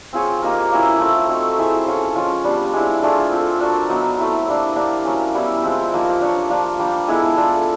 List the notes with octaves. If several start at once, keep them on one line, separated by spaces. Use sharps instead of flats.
C4 F4 G#4 C#5
A#3 D#4 G4 A#4
F#3 A#3 C#4 E4
A3 C4 F4 A#4
C4 D#4 F#4 A4
E4 G#4 C5 E5
C#4 F4 A4 C#5
F3 G#3 C#4 F4
G3 B3 D4 G4
G#3 C4 E4
A3 D4 F4 G#4
C4 F4 A4
D4 F#4 A#4
F#3 B3 D#4
A3 C4 E4
G3 A#3 D4
A#3 D4 G4
F#3 A#3 C#4
G3 B3 E4
F3 G#3 C4
F3 A#3 D#4 G4
D4 G4 A#4 C#5
F3 A#3 D4
G3 A#3 D4 G4
G#3 B3 E4 A4
D4 F4 A4